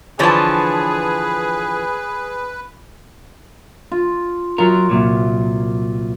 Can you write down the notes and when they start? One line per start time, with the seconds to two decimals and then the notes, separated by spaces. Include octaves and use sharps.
0.19 D3 E3 F3 G#4 B4 C#5 A5
3.92 F4
4.58 F#3 F4 A#4
4.90 C2 A#2 F#3